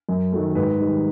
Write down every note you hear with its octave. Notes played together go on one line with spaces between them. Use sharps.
F#2
D#3 F#3 A3
G#2 B4
D#3 G3